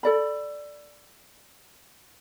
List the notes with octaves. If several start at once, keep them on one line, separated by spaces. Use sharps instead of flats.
A4 D5 B5